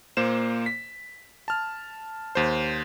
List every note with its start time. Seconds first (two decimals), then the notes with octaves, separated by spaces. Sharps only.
0.17 A#2 A#3 C5 E7
0.66 B6
1.48 A5 F6
2.35 D#2 C5